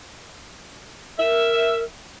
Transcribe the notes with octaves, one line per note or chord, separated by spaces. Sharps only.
A#4 E5